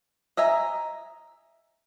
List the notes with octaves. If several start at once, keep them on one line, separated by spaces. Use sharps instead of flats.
D#5 E5 G#5 A#5